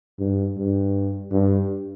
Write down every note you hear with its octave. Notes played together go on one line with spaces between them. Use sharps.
G2
G2
G2